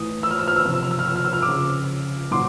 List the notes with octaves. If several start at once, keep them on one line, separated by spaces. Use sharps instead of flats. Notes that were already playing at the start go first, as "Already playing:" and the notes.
Already playing: A2 E3 D#6
E6
F6
E6
F6
E6
C3 F3 F6
E6
F6
E6
F6
E6
F6
E6
F6
D6 E6
C#3 F3
A#2 F#3 C6 D6